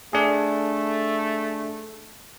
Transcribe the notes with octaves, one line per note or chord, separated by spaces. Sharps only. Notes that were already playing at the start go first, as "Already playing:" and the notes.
A3 D4 G#4